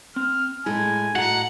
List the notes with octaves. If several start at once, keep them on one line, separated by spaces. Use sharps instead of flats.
C4 F6
A2 G#3 E4 G#5
A2 F#4 D#5 F#5 A#5